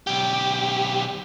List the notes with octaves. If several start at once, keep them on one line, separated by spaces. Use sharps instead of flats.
B1 G4